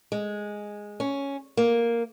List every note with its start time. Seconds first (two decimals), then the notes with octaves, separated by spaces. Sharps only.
0.12 G#3
1.00 C#4
1.57 A#3